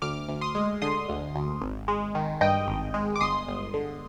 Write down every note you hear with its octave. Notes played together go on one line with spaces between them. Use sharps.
D2 D6 F6
D2
C6 D#6
G#3
D3 C6 D#6
D2
D2
G#1
G#3
D#3
G2 D#5 G5
G#1
G#3
D6
G1 C6 D#6
G1
D3